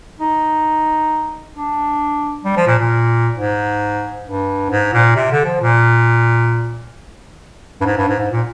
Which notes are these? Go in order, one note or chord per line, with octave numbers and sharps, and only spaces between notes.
D#4
D4
G3
F3
A#2
A#2
G#2
G2
G#2
A#2
C3
D3
F3
A#2
G2
G#2
G2
G#2
G#2
A#2